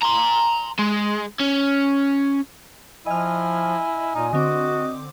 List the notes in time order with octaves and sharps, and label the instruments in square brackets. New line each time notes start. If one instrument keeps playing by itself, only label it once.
[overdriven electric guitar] A#5 C6
G#3
C#4
[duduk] F3 [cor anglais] E4 [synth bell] D#5 F6 [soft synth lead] G#5
[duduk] A#2 [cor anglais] D#4
[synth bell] D3 C4 D6 [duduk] F#4 [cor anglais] D#5